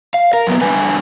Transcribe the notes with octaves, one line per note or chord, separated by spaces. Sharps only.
F5
A#4
F#2 B3
E2 D3 G3 B4 G#5